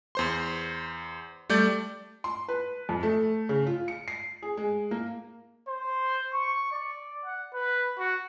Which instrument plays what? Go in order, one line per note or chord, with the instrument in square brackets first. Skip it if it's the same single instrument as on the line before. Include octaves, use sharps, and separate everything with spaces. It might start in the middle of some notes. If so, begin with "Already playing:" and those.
[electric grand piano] E2 C5 C6
G3 A3 D5 G6
[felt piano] C6
B4
F2
A3
C#3
F4
C#7
C7
G#4
G#3
A#3
[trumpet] C5
C#6
D5
F#5
B4
F#4